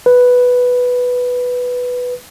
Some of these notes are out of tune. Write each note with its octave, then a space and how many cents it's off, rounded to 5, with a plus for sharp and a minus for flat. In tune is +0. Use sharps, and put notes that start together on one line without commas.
B4 +0